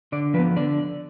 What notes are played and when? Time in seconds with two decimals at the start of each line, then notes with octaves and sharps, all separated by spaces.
0.12 D3 D5
0.34 F3 B4
0.39 B3
0.56 D3 D5